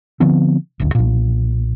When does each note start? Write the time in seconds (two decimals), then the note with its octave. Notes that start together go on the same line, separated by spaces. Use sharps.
0.20 D3 F3 B3 C4
0.80 D#1 A1 D2
0.95 B1 A#2